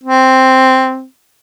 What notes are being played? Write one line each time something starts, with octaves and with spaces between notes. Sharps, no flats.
C4